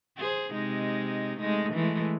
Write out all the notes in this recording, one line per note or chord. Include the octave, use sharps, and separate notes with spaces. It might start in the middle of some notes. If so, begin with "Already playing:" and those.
G#4 C5
C3 G#3 D#4
G#3 A3 D#4
E3 G#3 A3